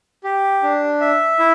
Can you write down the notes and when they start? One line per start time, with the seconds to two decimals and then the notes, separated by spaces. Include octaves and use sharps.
0.24 G4
0.63 D4
1.01 E5
1.39 E4